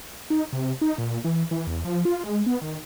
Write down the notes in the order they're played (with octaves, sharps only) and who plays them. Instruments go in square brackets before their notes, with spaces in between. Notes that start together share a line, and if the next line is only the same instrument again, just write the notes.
[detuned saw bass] D#4
C3
D#4
A#2
E3
E3
E2
F3
F4
G#3
B3
D#3